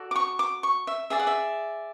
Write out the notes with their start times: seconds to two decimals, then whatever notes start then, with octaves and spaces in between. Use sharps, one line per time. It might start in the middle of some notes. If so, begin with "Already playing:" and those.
Already playing: F#4 A4 D5
0.11 D6
0.16 C#6
0.39 D6
0.63 C#6
0.87 E5
1.10 G#4 D5 E5
1.19 F#5
1.27 E5